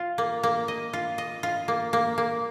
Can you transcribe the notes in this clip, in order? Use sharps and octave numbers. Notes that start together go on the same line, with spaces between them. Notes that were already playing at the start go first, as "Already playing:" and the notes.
Already playing: F4
A#3
A#3
D#5
F4
D#5
F4
A#3
A#3
A#3